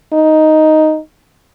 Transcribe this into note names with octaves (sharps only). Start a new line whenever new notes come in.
D#4